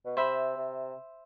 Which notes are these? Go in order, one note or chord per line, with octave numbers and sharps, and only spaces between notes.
B2
C3 C5 E5 B5
C3